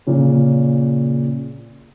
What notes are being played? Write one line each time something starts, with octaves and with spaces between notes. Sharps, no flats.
A#2 C#3 C#4